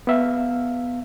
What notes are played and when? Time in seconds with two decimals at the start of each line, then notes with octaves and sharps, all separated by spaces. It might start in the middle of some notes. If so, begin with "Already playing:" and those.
0.07 B3 E5 F5